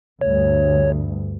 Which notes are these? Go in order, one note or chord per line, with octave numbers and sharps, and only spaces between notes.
D2 G2 C#5